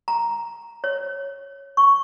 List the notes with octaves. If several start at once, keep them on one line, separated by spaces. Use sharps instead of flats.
A#5
C#5
C#6